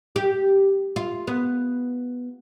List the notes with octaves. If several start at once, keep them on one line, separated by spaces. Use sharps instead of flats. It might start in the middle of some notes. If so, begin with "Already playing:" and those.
G4
F4
B3